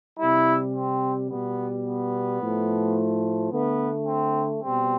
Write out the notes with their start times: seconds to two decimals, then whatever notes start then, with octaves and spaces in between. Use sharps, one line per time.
0.19 C3 G3 E4
0.74 C4
1.30 B2 G3 B3
1.85 B3
2.41 A2 F3 A3
3.51 D3 A3 B3
4.07 C4
4.63 B2 G3 C4